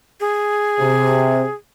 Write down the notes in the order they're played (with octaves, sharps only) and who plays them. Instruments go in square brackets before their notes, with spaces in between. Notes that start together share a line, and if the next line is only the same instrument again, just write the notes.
[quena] G#4
[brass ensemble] C3